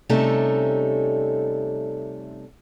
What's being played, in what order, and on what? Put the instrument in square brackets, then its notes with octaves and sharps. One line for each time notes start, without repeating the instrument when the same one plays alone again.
[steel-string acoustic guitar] C3 G3 A3 C#4 D#4 A4